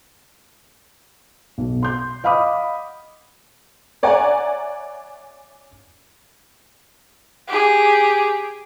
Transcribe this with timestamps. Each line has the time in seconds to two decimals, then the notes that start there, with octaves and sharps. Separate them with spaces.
1.58 B1
1.83 C6 G6
2.24 D#5 F5 F#5 B5 D6 D#6
4.03 C#5 D5 E5 F#5 G#5 A#5
7.48 G4 G#4